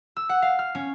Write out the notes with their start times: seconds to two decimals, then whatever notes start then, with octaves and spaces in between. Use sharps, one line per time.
0.17 E6
0.29 F#5
0.42 F5
0.59 F6
0.75 C#4